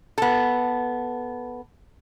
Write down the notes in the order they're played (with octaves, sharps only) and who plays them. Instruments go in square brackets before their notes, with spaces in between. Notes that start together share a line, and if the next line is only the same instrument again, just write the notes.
[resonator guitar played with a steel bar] B3 A4